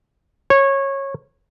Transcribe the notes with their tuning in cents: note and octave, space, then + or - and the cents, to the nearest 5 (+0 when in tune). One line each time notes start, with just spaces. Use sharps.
C#5 -20